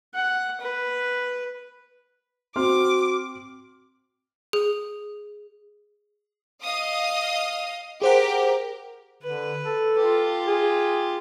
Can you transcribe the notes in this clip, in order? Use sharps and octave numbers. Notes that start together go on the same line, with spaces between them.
F#5
B4
C4 F#4 C6 D6 F6
G#4
D#5 F5 D#6
G4 G#4 A#4 C5 F#5
D3 B4
A4
F4 G4
G#4